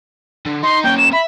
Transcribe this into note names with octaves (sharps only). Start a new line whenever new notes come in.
D3
D#4 D#5 C6
A#3 C#4 G5
E7
E5 B5